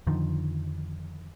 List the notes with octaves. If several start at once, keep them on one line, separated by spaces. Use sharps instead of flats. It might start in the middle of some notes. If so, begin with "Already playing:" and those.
F2 D3 D#3 F3